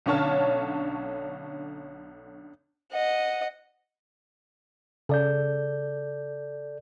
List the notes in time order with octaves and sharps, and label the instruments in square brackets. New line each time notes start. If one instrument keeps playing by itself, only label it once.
[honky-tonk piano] B1 D3 C#4 C#5 A5 F6
[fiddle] D#5 F#5
[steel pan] C#3 [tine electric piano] A4 D5 G6